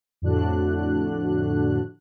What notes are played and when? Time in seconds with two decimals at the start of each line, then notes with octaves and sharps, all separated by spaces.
0.22 F2 A2 D3 D4 F#4 F#6